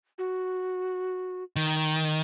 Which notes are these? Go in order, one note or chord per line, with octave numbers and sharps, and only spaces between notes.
F#4
D#3